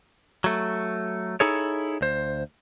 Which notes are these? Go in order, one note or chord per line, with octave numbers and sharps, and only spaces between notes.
F#3 A3
D#4 E4 G#4 A4 C#5
D2 C5